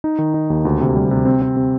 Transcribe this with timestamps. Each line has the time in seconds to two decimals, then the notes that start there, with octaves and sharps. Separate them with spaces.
0.04 D#4
0.19 D#3
0.34 D#4
0.50 D#2
0.65 D2
0.81 C3
0.96 G3
1.11 C3
1.25 C4
1.42 C4
1.57 C3